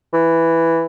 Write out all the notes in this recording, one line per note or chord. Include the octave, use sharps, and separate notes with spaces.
E3